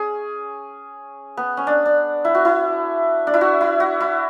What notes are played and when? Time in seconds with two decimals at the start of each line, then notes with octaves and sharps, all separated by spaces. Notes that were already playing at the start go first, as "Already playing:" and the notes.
Already playing: C#4 G#4
1.37 B3
1.57 C#4
1.67 D4
1.86 D4
2.25 E4
2.35 F#4
2.45 E4
3.27 D4
3.34 E4
3.41 F#4
3.61 E4
3.80 F#4
4.01 E4